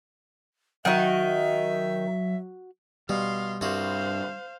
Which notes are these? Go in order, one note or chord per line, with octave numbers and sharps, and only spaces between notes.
D#3 F#3 D#4 F#4 E5 F#5
B2 G3 F5 C6
C2 G2 F#4 C5 F5